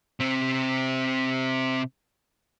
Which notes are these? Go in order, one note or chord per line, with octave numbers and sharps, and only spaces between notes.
C3 C4